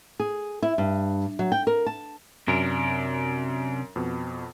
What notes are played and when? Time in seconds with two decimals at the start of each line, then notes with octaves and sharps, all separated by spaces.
0.20 G#4
0.63 E4
0.78 G2
1.39 F#3
1.52 G5
1.67 A#4
1.86 A5
2.48 F#2 C3 D4 A#4
3.96 F2 B2